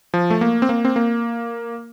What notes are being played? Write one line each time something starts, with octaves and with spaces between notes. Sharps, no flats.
F3
A3
A#3
C4
A#3
C4
A#3